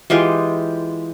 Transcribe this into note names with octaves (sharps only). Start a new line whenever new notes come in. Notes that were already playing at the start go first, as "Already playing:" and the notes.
E3 G#3 F4 G4